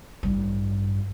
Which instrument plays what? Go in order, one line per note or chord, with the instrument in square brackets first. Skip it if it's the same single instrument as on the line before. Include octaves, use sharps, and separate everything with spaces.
[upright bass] A1 G2